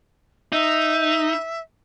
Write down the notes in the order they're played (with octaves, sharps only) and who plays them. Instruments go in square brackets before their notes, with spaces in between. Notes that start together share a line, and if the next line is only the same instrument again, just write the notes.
[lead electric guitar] D#4 [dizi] E5